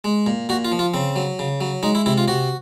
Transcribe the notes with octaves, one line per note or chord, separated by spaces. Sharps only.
G#3
A#2
A#2 F#4
F4
F3
F4
C#3 C4
F#3
C#3
F#3
G#3 D#4
E4
C3 E4
F4
C3 F#4